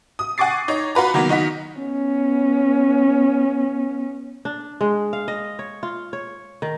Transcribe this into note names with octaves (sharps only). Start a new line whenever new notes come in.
D#6
F#5 G#5 C#6 D6 A6 C7
D#4 C#5
F4 F#4 B4 A#5
D#3 F#3 A#3 B3
D#3 D#4 F#4 B6
B3 C#4
D4
G#3
F5
D#5
C#5
F4
C#5
D#3